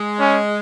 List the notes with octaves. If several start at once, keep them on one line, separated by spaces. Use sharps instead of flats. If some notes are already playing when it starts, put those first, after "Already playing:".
Already playing: G#3
C#4